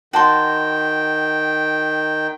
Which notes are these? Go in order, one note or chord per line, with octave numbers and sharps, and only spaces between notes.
D#3 F#4 G5 A5 C6